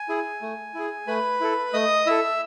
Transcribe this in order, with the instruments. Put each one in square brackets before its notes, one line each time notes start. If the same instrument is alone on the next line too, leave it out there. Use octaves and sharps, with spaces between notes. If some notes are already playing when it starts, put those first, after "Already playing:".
Already playing: [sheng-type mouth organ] G#5
E4 G#4
A3
E4 G#4
A3 B4 B5
E4 A4
A3 D#5 D#6
E4 A4 E5 E6